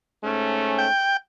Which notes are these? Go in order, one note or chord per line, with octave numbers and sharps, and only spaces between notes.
G#2 A3 C#4
G5